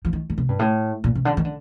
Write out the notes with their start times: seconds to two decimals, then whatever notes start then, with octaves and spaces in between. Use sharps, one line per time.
0.05 F3
0.13 D#3
0.30 D3
0.38 C3
0.49 G2
0.59 A2
1.04 A#2
1.15 C3
1.25 D3
1.37 D#3
1.45 D3